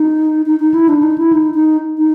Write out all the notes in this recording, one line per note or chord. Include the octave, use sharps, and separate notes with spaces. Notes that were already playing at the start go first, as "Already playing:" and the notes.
Already playing: D#4
D#4
D#4
E4
D4
D#4
E4
D#4
D#4
D#4